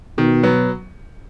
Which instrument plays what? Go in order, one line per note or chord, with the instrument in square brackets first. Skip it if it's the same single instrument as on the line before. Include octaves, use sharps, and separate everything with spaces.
[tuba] B2 [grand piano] D#3
[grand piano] F#3 B3